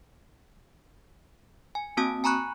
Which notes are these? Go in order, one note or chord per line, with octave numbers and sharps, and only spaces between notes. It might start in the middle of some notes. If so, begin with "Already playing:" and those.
G#5
A#3 C4 F#4 A5 D#6
G#5 A#5 B5 C#6 F#6